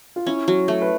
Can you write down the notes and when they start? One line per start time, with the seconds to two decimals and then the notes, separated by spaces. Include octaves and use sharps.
0.16 F4
0.26 C#4 E4
0.48 F#3
0.68 A3
0.82 B4